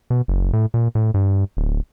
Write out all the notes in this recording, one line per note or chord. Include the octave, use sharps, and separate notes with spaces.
B2
F#1
A2
A#2
A2
G2
D1